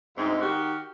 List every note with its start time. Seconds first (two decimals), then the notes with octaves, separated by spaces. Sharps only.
0.17 D2 G#2 C4 D#4
0.40 D#3 F#4 G4